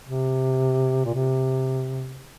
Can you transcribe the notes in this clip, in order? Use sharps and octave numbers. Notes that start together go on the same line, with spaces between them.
C3
A#2
C3